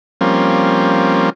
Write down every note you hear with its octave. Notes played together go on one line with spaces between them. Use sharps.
F3 G3 A#3 C4 C#4